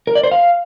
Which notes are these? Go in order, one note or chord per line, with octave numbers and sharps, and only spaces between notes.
A#4
D5
C5
F5